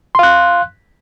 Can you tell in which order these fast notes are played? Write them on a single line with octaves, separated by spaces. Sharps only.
C6 F5 F#6